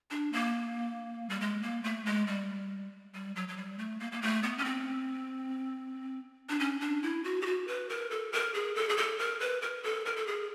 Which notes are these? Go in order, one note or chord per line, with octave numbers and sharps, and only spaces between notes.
D4
A#3
G3
G#3
A#3
A3
G#3
G3
G3
F#3
F#3
G3
A3
A#3
A#3
A3
B3
C#4
C4
D4
C#4
D4
E4
F#4
G4
F#4
B4
A#4
A4
A#4
G#4
A4
G#4
A4
A#4
B4
A#4
A4
A#4
A4
G#4